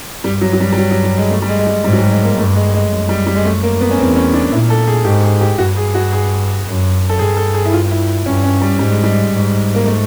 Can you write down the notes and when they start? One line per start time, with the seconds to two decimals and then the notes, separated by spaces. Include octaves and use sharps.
0.24 G2 G3
0.41 F#3
0.53 F#3
0.60 G3
0.72 G3
0.77 F#3
0.91 F#3
1.04 G3
1.18 G#3
1.31 A3
1.42 G3
1.49 G#3
1.59 G#3
1.67 G3
1.84 G#2 G3
1.93 F#3
1.98 G3
2.11 G#3
2.24 A#3
2.38 G2 A3
2.55 G#3
2.74 G#3
2.91 F#2
3.09 G3
3.27 G3
3.36 G#3
3.45 A3
3.63 A#3
3.81 B3
3.91 C#4
3.98 E2 C4
4.16 C#4
4.34 D4
4.52 A#2 E4
4.70 A4
4.87 G#4
5.05 G#2 G4
5.23 G#4
5.41 G4
5.58 G2 F#4
5.76 G#4
5.95 F#4
6.12 G#4
6.65 F#2
7.09 A4
7.19 G2 G#4
7.37 A4
7.54 G#4
7.65 E4
7.73 F4
7.91 E4
8.26 G2 C#4
8.44 C#4
8.61 G3
8.79 G#2 G3
8.91 G#3
9.04 G3
9.33 G#2
9.75 A#3
9.86 A3